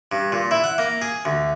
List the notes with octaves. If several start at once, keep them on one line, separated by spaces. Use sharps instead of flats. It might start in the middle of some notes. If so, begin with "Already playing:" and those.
G2
A#2
E4
F#5
A#3
G#4
D2